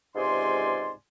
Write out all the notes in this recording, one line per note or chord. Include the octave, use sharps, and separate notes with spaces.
C#2 G#2 C3 D5 G#5 C6